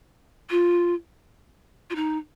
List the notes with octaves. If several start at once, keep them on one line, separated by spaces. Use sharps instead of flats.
F4
F4
D#4